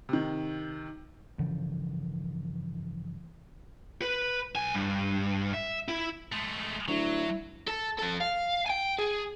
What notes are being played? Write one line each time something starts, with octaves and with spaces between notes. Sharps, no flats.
C3 D#3
G2 C#3 E3 F3
B4
B1 G#5
G2
E5
E4
G#3 A3
D2 F#3 E4
A4
F3 A4
F5
G5 G#5
G#4